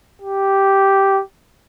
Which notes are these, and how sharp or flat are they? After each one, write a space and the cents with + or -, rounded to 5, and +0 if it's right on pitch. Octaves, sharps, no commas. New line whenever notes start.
G4 -5